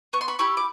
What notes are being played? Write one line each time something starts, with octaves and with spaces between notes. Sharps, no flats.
B3 C#6
C6
B5 C#6
E4 G4 B5 C#6
D6